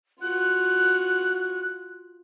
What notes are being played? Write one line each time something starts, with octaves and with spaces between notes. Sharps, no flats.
F4 F#4 F#6